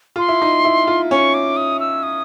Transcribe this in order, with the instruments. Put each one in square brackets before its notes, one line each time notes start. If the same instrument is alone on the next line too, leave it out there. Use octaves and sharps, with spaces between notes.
[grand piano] F4 [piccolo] C6
[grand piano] E4
D#4
E4
F4
[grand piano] C#4 [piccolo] C#6
[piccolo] D6
D#6
E6
D#6